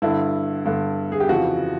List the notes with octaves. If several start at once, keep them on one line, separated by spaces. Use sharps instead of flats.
G2 D3 E4
G2 D3
G#4
G4
F2 C#3 E3 F#4